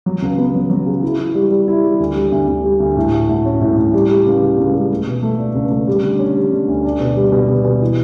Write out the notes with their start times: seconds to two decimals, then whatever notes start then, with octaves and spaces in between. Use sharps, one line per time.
0.06 F#3
0.22 C#2
0.38 B3
0.54 F#3
0.70 F#3
0.86 C#3
1.03 E4
1.19 E4
1.35 G3
1.51 G3
1.68 E4
1.83 G3
2.00 D2
2.16 G3
2.32 D2
2.48 D2
2.64 G3
2.80 D2
2.96 A2
3.13 F#4
3.29 A2
3.46 C#4
3.61 A2
3.77 A2
3.93 G3
4.09 G3
4.26 C#2
4.42 C#3
4.58 C#2
4.74 G3
4.91 A3
5.07 B2
5.23 A3
5.38 D4
5.55 C#2
5.71 A3
5.87 G3
6.03 D3
6.19 C#4
6.36 G3
6.52 D3
6.68 D2
6.85 D4
7.00 B2
7.16 G3
7.32 B2
7.48 B2
7.65 B2
7.81 E3